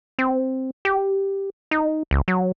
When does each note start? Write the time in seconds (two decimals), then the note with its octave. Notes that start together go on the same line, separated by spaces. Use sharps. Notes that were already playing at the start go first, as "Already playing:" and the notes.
0.19 C4
0.85 G4
1.71 D#4
2.11 C#2
2.28 F#3